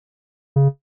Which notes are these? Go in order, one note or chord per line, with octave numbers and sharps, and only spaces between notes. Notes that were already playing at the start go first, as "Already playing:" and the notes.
C#3